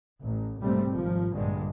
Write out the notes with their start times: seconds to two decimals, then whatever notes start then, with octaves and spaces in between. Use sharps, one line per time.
0.20 A1
0.59 B1 G#2 C3 G3 A3 C4
0.92 G#1 F3
1.33 A#1 G2 D3 G#3